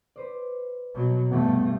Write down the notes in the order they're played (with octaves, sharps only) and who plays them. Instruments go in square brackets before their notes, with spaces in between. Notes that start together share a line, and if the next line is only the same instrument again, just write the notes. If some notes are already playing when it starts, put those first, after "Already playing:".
[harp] B4 C5 D5
[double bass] B2 F#3
[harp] E2 E3 [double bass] G2 A3 [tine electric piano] C3 B3